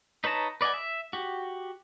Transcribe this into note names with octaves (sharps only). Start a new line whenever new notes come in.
D#4 B4 C#5 A5 A#5
B4 D5 D#5 F#5 G#5
E5
F#4 G4